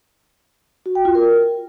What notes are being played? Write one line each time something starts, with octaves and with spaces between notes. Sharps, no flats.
F#4
G5
F4
A#4